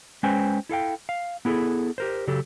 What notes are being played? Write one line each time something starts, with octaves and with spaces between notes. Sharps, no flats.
G#3 C#4 B4 C5 G5 G#5
E4 A4 F5 G5
F5
B3 E4 G#4 A4
G4 A#4 C5
C#3 F#3 G4 A4